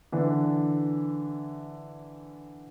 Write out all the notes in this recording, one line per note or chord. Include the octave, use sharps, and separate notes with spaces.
D3 E3 D4